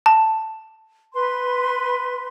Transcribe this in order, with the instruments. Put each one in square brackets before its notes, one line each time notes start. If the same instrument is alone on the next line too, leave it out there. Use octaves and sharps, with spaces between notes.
[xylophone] A5
[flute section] B4 C6